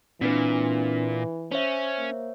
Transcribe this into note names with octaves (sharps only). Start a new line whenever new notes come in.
A#2 E3 C4 D4 B4
C#4 C5 C#5 E5
A#3